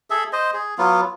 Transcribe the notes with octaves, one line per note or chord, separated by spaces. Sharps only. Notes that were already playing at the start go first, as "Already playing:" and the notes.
G#4 A4 E5
C5 D#5
G#4
F#3 B3 F4